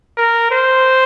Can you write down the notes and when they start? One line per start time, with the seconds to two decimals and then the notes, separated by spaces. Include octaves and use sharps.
0.17 A#4
0.51 C5